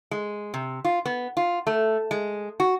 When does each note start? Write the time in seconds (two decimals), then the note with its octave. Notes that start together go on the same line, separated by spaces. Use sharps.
0.11 G#3
0.54 C3
0.85 F4
1.06 B3
1.37 F4
1.67 A3
2.11 G#3
2.60 F#4